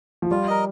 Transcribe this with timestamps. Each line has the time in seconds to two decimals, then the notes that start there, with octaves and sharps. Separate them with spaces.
0.22 F3
0.31 G3 F4
0.48 A#4 D#5